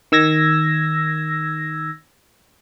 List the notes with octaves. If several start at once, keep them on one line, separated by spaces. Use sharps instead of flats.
D#3 E6 G#6 A#6